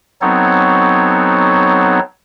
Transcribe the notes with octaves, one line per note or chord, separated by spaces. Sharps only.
F#3 B3 C4 D#4 A4 C#5